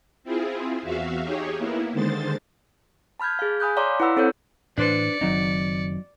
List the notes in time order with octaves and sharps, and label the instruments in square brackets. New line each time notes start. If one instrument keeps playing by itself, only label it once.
[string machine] C4 E4 F4 G#4
E2 F#4 E5 F5
D#4 G4 G#4 C#5
A#3 B3 E4
D3 D#3 G#3 C5 A6
[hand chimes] A5 B5 F6 G6 G#6
G#4 F5
F5 G#5 B5 D#6 F#6 G6
C#5 D5 F5 A#5 C6 D6
E4 B4 F#5 B5 E6
C4 A4 C5 C#5 F#5 G6
[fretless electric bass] A2 E3 [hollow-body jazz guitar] D4 B4 C5 [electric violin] D5 C#7
[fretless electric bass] F#1 D#3 C4 [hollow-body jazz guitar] F#3 D#4